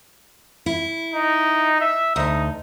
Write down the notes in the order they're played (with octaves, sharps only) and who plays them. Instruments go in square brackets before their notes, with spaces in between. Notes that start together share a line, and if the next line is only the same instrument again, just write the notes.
[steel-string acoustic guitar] E4
[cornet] D#4
E5
[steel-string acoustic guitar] D2 [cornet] D#4